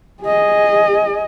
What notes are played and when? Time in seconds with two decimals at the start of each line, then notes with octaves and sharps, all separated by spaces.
0.22 G#4 D#5